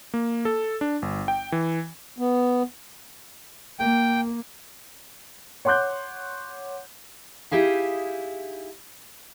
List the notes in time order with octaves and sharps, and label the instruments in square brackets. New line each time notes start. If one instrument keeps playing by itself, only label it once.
[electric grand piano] A#3
A4
D4
G1
G5
E3
[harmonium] B3
[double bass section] A#3 [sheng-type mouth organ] G5
[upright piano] C#5 F#5 C6 D6 F#6 G6
[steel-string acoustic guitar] D#4 E4 G4 G#4 F5